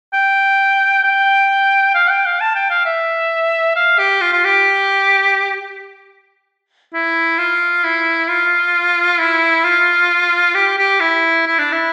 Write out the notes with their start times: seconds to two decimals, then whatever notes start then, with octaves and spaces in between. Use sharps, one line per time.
0.14 G5
1.04 G5
1.95 F5
2.10 G5
2.26 F5
2.41 A5
2.55 G5
2.70 F5
2.86 E5
3.76 F5
3.99 G4
4.21 F4
4.32 F4
4.45 G4
6.94 E4
7.38 F4
7.84 E4
8.29 F4
9.19 E4
9.64 F4
10.55 G4
10.78 G4
11.00 E4
11.46 E4
11.59 D4
11.72 E4